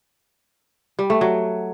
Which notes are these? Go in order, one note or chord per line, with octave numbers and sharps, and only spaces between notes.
G3
A3
F#3